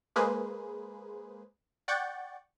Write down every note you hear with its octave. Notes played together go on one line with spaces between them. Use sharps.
G#3 A#3 G#4 B4 C5
D5 F#5 G5 C#6 G6 A6